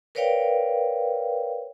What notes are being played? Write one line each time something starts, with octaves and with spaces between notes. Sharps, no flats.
A#4 B4 C#5 D5 F5 G5